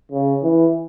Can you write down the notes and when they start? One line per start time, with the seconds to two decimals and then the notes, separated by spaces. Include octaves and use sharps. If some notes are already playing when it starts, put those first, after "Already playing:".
0.12 C#3
0.43 E3